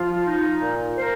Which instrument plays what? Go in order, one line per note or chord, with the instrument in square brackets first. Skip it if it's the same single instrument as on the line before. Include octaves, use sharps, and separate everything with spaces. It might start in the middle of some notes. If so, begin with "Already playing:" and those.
Already playing: [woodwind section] F3 [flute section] F4
[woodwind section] D#4
A#2
[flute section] A#4 [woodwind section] C5